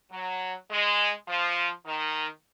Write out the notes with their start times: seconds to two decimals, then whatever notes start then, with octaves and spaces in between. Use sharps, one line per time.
0.12 F#3
0.70 G#3
1.28 F3
1.86 D#3